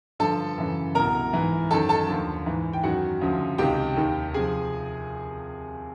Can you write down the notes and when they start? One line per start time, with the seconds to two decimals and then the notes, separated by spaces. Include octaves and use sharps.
0.20 G2 D3 F3 A4 A5
0.57 F#2 C#3 E3
0.95 C2 B2 A#4 A#5
1.33 G#2 E3
1.71 F#2 D#3 A4 A5
1.89 A4 A5
2.08 D#2 D3 F3
2.46 G#2 E3
2.73 G5
2.83 F#2 D#3 F#4 F#5
3.21 D2 C#3 F3
3.58 C#2 C3 D#3 G4 G5
3.97 D#2 D#3
4.34 C3 F3 G#4 G#5